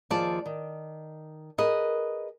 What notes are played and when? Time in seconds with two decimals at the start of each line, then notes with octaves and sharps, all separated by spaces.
0.10 D#2 F3 G#4 D5 A5
0.46 D#3
1.58 G#4 A#4 B4 D#5